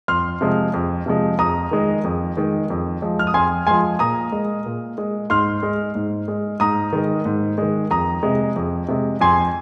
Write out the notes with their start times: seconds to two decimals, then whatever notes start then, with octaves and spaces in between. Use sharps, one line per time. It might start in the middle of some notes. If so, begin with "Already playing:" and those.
0.08 F2 C6 F6
0.41 C3 F3 G#3
0.74 F2
1.06 C3 F3 G#3
1.39 F2 A#5 D#6
1.71 D#3 G#3
2.04 F2
2.37 D#3 G#3
2.70 F2
3.02 F3 G#3
3.19 F6
3.27 D#6
3.34 F2 G#5 C6
3.67 F3 G#3 G#5 C6
3.99 A#2 A#5 D#6
4.32 G#3
4.66 A#2
4.98 G#3
5.30 G#2 C6 F6
5.63 G#3
5.95 G#2
6.28 G#3
6.60 G#2 A#5 D#6
6.93 D#3 G#3
7.25 G#2
7.58 D#3 G#3
7.91 F2 A#5 D#6
8.23 C3 G#3
8.56 F2
8.88 C3 G#3
9.21 F2 G#5 C6